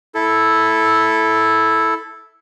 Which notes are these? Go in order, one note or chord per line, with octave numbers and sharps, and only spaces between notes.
E4 A4